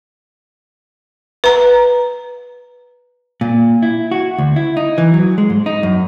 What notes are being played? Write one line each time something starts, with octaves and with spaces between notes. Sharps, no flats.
B4 A#5
A#2
E4
F#4
D2
E4
D#4
E3
F#3
G#3
G#2
D#4
F#2